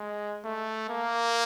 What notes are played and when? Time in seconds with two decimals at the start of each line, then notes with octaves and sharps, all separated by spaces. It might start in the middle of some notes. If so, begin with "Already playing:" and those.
Already playing: G#3
0.44 A3
0.89 A#3